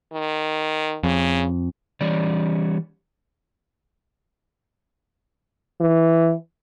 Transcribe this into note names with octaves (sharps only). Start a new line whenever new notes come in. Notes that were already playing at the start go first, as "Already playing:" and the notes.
D#3
F2 C#3
E3 G3 C#4 D5
E3